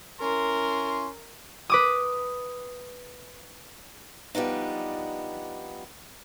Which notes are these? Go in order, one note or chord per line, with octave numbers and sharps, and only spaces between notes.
C#4 E4 A#4 C6
B4 D6 D#6
F3 G3 B3 D4 D#4